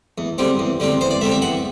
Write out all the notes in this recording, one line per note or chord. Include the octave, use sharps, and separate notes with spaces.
E2
D3 G3 C4
E2
D3 G3 C4
E2 C5
D5
D3 G3 C4 E5
E5
E2 F#5